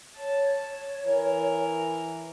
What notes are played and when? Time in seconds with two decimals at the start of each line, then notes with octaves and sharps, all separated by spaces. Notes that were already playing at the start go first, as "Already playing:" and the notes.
0.17 C#5 A5
1.06 E3 A#4